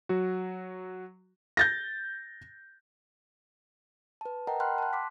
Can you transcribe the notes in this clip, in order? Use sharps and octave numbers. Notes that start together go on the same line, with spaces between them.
F#3 F#4
G6 A6 A#6
B4 A5
A#4 D#5 F#5 G5 A5 A#5
F#5 G5 B5 C6 F6 F#6
A5 F#6
C6 D6 B6